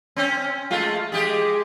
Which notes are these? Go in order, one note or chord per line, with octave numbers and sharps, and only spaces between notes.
C4 C#4
G#3 A3 F4
G#3 G4 G#4